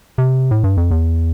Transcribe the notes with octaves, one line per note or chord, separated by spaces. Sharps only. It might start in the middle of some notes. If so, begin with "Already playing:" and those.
C3
A2
G2
F2
E2